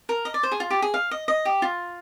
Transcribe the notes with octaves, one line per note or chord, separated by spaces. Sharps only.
A#4
D#5
D5
C5
G#4
F4
G4
G#4
F5
D#5
D#5
G4
F4